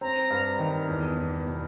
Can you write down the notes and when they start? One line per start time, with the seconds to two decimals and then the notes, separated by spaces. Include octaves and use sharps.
0.01 C4 A#5
0.30 G2
0.59 D#3
0.88 E2
1.17 E2
1.46 B2